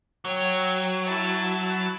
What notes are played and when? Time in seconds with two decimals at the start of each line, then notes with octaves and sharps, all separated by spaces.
0.25 F#3 C#5 G5
1.06 E4 A5